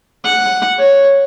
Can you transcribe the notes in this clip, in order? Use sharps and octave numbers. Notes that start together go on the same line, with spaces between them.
F#5
C#5